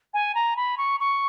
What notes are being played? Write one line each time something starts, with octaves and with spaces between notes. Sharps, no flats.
G#5
A#5
B5
C#6
C#6